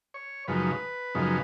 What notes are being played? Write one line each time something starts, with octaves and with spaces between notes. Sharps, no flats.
C#5
F#2 C#3 F3 G#3 D#4 B4
F#2 C#3 F3 G#3 D#4